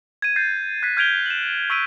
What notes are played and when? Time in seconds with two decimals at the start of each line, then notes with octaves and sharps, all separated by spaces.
0.22 G#6 D#7
0.36 G6 A6 C7
0.83 F#6 G#6 B6 C7
0.97 F6 G6 G#6 D7 F7 G7
1.26 E7 F#7
1.70 C#6 E6 G#6 B6 D7 D#7